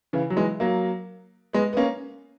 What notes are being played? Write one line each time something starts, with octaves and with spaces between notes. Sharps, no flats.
C#3 E3
F#3
E3 G#3
F#3 A#3
G#3 B3
B3
A#3 C#4